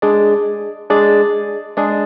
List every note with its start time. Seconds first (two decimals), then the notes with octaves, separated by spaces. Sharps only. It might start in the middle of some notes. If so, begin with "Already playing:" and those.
0.02 G#3 D4 G#4 D5
0.90 G#3 D4 G#4 D5
1.77 G#3 D4 G#4 D5